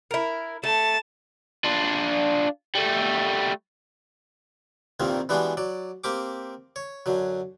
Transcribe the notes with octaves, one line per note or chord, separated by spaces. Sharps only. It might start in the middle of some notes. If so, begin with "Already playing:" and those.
E4 A#4
A3 A5
D4 F4
G3 A3
C2 G2 A#2 D#3 A#3 C4
E3 G3 G#3 B3 D4 F#4
F#3 D5
A#3 C4 G4 D6
C#5
F#2 D3 F#3